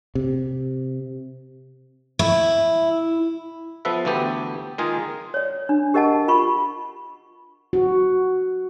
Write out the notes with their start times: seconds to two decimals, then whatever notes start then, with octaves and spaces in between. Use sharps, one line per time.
0.15 C3
2.19 E4
3.85 F3 B3 A4 B4 E5
4.05 D2 E3 B3 G4 A4
4.78 D#3 G#3 A#3 F4 G#4 G#5
5.34 C#5 D5
5.69 D4
5.94 G4 A#4 D#5 F#5 A5
6.28 F4 B5 C#6
7.73 F#4